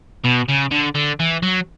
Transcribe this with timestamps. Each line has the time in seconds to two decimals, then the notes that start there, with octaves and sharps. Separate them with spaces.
0.24 B2
0.49 C#3
0.71 D3
0.95 D3
1.20 E3
1.43 F#3